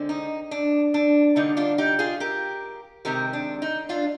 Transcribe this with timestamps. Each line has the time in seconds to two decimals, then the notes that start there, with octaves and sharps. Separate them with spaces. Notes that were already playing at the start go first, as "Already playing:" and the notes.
Already playing: D3 G#3 C4
0.09 D#4
0.51 D4
0.94 D4
1.36 D3 G3 A#3 D#4
1.57 D4 F4
1.78 D#4 G4
1.99 F4 G#4
2.20 G4 A#4
3.05 C3 D#3 G#3 C4 G4 A#4
3.33 D4
3.62 D#4
3.89 D4 F4